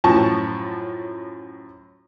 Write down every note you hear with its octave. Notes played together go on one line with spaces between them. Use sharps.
F#2 A2 F3 A5 C#6